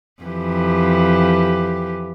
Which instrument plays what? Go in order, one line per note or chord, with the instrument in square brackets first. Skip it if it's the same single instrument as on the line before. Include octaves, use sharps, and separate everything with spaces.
[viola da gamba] F2 E3 G4